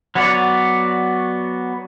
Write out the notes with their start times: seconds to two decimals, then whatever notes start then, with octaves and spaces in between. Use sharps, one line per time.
0.15 F#3 B3 F#4 C#5 D5